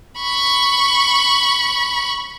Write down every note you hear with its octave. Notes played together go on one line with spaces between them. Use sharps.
B5 C#6